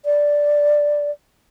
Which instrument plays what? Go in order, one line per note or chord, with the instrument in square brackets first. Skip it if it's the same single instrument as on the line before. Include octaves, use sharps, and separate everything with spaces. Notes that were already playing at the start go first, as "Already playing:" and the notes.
[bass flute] D5